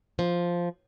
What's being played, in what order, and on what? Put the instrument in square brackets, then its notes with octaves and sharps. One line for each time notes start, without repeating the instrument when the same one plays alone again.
[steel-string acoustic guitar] F3